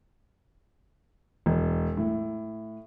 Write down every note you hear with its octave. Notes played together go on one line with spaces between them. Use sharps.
E1
A2